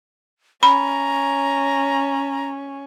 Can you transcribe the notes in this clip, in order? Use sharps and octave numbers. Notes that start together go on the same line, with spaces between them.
C#4 A#5 B5